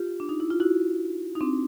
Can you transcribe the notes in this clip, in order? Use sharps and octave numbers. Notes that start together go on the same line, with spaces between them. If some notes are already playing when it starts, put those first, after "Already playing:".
Already playing: F4 G4
D4
D#4
E4
F4
E4 F#4
D#4
C4 D4